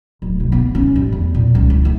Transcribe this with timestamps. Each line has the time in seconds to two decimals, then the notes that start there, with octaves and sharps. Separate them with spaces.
0.22 D1
0.40 B1
0.52 B3
0.75 C#4
0.96 A1
1.12 E2
1.34 A#2
1.55 C#2
1.70 E4
1.85 A3